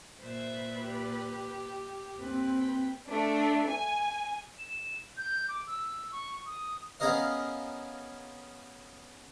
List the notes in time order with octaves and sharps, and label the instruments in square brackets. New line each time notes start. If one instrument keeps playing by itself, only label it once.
[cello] A#2 B4 [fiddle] C5 E5
[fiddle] G4
[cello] D#2 B4 [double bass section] C4
[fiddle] G5
[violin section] A3 D4
G#5
[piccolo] E7
G6
D6
E6
C#6
D#6
[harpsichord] B3 C#4 G#4 A#4 D#5 F5